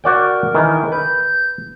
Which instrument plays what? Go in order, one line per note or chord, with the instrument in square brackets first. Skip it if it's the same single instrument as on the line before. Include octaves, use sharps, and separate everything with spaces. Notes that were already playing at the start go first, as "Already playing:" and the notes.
[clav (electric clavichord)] F#4 D5 G5 [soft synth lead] A#4
[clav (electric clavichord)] D#3 E3
[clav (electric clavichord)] B4 [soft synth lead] G6